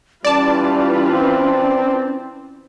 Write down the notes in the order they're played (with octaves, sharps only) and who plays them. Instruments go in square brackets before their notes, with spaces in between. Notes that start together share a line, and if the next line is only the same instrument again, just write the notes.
[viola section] E3 F4 B4 [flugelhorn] G3 [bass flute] C#4 [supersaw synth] D5 A5
[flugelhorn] C4